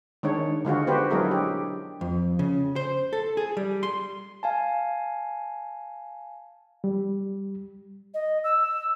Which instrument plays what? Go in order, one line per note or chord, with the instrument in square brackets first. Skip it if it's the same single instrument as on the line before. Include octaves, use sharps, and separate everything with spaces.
[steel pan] D#3 G#3 D4 C#5
D3 G#3 F4 F#4
B3 F#4 G4 B4 C5
F#3 G#3 D4 E4 G#4 A#4
G4
[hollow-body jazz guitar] F2
C#3
C5
A4
G#4
G3
C6
[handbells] F5 G#5 A5
[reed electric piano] G3
[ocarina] D#5
E6